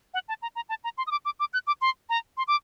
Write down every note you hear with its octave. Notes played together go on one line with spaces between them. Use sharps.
F#5
A5
A#5
A#5
A5
A#5
C6
D#6
D6
D6
D6
F#6
D6
C6
A#5
C6
D6